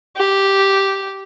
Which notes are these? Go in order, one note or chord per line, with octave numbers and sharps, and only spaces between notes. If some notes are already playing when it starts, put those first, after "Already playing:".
G4